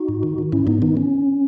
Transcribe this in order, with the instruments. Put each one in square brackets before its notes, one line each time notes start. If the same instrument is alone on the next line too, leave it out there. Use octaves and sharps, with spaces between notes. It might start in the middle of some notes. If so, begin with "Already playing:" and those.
Already playing: [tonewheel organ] D#4 F#4
G#2
D#3
D#3
G#2 C#4 E4
G#2 B3 D#4
D#3 B3 D#4
C#4